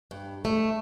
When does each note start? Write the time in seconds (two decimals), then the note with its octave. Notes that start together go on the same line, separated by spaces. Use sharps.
0.11 G2
0.45 A3